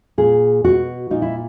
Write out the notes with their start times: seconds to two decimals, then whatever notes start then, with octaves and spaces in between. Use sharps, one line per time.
0.18 A#2 G#4
0.64 B2 F#4
1.11 A#2 D#4
1.22 E4